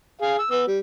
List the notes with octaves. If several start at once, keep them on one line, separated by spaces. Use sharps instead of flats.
G#4 F5
E6
B3 E6
G3